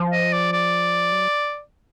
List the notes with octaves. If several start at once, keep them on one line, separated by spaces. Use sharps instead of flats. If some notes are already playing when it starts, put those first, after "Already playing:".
Already playing: F3
D#5
D5
D5
F#3